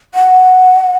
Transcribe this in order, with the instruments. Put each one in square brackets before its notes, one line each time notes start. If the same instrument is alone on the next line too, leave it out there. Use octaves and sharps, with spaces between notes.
[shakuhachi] F#5